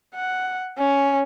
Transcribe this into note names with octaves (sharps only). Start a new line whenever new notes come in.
F#5
C#4